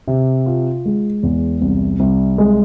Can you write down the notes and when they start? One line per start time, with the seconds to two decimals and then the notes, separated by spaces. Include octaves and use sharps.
0.08 C3
0.46 F4
0.85 G#3
1.23 E2
1.62 C2
2.00 C2
2.38 G#3